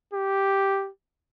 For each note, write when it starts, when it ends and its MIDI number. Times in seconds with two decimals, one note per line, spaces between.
0.14 0.89 67